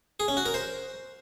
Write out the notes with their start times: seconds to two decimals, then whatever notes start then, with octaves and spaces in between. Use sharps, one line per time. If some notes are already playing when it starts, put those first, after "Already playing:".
0.20 G#4
0.28 C#4
0.37 F#4
0.46 A#4
0.54 C5